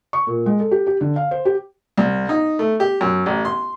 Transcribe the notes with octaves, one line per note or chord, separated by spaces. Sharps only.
C#6
A#2
G#3
A4
G4
G4
D3
F5
C5
G4
C2
D#4
A3
G4
F#2
A1
C6